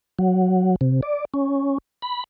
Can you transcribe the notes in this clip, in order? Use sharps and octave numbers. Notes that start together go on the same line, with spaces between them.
F#3
C3
D5
C#4
B5